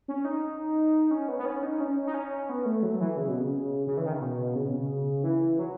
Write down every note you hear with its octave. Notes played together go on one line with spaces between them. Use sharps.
C#4
D#4
C#4
B3
B3
C#4
D#4
C#4
D#4
C#4
B3
A3
F#3
E3
C#3
B2
C#3
C#3
E3
D#3
C#3
B2
C#3
B2
C#3
E3
F#3